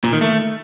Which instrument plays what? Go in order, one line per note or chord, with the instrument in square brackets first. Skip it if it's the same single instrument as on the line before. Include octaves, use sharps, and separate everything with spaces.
[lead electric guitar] A#2
D#3
A3